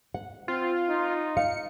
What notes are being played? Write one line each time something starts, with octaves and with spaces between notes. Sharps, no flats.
F#5
C4 F4
D#4
F5 C#7